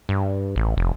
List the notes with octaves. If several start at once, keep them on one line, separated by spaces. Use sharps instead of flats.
G2
A1
F1